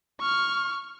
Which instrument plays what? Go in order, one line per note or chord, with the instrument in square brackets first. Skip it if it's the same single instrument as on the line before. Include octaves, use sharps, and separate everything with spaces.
[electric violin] C#6 F6